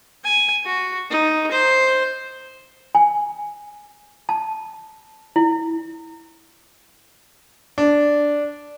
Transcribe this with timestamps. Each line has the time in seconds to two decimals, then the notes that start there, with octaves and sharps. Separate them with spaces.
0.24 G#5
0.65 F#4
1.10 D#4
1.51 C5
2.95 G#5
4.29 A5
5.36 E4
7.78 D4